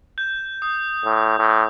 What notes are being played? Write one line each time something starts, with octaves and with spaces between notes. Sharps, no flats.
G6
D#6
A2
A2